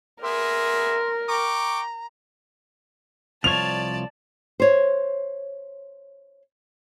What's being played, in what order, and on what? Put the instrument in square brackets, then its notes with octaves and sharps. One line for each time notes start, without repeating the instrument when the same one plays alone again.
[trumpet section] B3 G#4 E5 [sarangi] A#4 [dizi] C6
[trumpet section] G5 C#6 D6 [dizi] A#5
[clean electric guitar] C2 F3 C#5 [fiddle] D5 A5 [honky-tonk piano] F7
[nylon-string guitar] C5 C#5